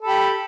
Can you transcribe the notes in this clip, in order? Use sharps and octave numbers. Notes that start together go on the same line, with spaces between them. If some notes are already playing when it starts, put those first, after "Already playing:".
G4 A4 B5